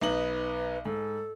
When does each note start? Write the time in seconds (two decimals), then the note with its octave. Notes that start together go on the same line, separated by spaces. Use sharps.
0.01 B1 D#4 B4 F#7
0.85 G#2 A4